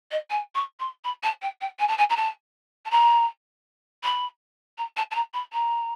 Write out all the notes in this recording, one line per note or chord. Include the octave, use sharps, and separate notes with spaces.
D#5
G#5
C#6
C6
B5
A5
G5
G5
G#5
A5
G#5
A#5
A5
A5
A#5
B5
A#5
A5
A5
A#5
B5
A#5